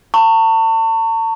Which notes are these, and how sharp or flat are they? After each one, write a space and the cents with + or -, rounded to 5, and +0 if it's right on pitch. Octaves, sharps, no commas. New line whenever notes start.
A5 +40 C#6 +0